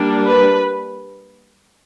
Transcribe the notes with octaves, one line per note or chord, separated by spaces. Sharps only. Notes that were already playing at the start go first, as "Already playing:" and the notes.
Already playing: G3 A#3 D4
B4